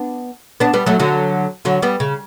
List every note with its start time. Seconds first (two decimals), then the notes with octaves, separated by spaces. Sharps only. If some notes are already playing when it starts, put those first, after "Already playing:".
Already playing: B3 D4
0.60 B3 D4
0.73 G3 B3
0.86 F#3 A3
0.99 D3 F#3
1.65 D3 F#3
1.82 G3 B3
2.00 C#3